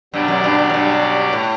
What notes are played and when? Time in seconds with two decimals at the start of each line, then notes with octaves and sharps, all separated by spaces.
0.14 G2 B2 F#3 C#4 G4 D5
0.28 F#2
0.44 G2
0.59 G2
0.70 A2
0.74 G2
1.33 A2